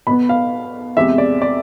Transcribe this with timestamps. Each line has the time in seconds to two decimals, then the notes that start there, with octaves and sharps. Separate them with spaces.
0.07 B2 B3 B5
0.29 F5
0.97 E2 C3 G#3 E5
1.18 D5
1.42 D5